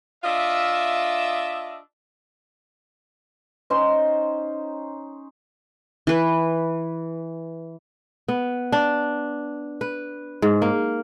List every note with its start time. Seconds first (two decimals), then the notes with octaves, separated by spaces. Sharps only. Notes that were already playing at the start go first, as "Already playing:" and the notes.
0.24 D4 F4 D#5 E5
3.70 C#4 D#4 C5 C6
6.07 E3 B4
8.28 B3
8.72 D4
9.81 B4
10.42 G#2
10.62 A#3